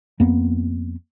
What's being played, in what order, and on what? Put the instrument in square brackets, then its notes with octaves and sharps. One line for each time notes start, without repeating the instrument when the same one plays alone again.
[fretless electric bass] F2 A#3 B3